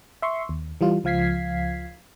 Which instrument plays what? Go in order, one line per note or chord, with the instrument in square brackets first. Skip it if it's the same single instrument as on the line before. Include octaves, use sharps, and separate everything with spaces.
[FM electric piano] E5 C6 C#6
D#2
E3 G3 F4
C#2 F3 F5 G#6 B6 C7